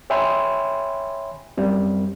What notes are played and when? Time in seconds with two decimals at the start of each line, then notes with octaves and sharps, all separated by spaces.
0.10 C#5 E5 G5 G#5 B5 C6
1.57 F#2 G3 C4